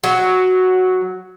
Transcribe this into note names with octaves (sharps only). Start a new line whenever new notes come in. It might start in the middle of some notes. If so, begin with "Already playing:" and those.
F#3